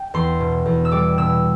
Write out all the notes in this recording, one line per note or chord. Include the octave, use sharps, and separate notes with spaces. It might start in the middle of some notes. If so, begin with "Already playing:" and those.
Already playing: G5
E2 C6
B2
E2
E6
G3 D6
B2 E6